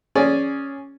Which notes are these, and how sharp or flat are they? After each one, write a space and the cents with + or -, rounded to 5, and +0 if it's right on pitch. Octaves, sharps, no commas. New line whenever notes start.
C#4 +0 G#4 +0 D5 -10